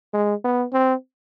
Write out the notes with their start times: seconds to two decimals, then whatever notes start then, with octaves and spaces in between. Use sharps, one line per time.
0.14 G#3
0.44 B3
0.73 C4